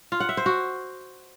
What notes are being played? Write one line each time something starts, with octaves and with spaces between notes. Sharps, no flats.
F4
F#5
E5
C5
F#4